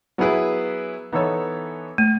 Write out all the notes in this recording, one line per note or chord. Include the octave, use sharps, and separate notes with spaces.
F#3 B3 E4 G#4 B4
E3 B3 D#4 A4 C#5
A3